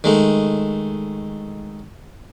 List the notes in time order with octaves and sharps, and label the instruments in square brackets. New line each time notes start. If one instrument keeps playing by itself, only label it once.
[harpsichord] D#3 G#3 A3